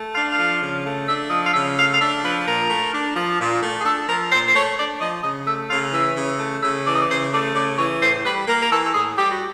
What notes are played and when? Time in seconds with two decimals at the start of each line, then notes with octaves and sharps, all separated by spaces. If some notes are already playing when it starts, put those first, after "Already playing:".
Already playing: A3
0.14 D4 F5
0.31 F5
0.38 F3
0.61 C#3
0.85 A3
1.07 D4 E5
1.30 F3 D#5
1.45 F5
1.53 C#3 E5
1.77 A3 F5
1.93 F5
1.99 D4 E5
2.23 F3 B4
2.46 A#2 A#4
2.69 A3
2.93 D4
3.15 F3
3.39 A#2
3.62 A3
3.79 G#4
3.84 D4 A4
4.08 F3 A#4
4.31 A#2 C5
4.47 C5
4.54 A3 C#5
4.78 D4 D5
5.00 F3 D#5
5.23 C#3 D#5
5.46 A3 E5
5.70 C#3 F5
5.93 E3 E5
6.16 C#3
6.39 A3
6.62 C#3 E5
6.85 E3 D5
6.93 D#5
7.01 D5
7.09 C#3 C5
7.32 A3 D5
7.54 C#3 D5
7.78 E3 C#5
8.01 A2 C5
8.24 G3 B4
8.47 A#3 A#4
8.62 A#4
8.70 E3 A4
8.85 A4
8.93 A2 G#4
9.16 G3 G4
9.31 F#4